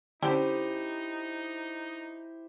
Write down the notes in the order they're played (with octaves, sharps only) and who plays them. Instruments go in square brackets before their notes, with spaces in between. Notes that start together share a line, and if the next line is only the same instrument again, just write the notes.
[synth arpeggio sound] D3 G5 B6 [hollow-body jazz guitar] C#4 E4 [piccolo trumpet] D#4 [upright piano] G4 C5